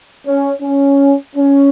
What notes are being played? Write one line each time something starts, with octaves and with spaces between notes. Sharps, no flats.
C#4
C#4
C#4